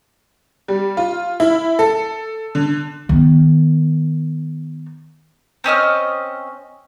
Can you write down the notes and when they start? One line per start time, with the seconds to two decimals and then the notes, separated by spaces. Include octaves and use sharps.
0.68 G3
0.97 F4
1.40 E4
1.79 A4
2.55 D3
3.09 D#3 B3
5.64 C4 C#4 D#5 F6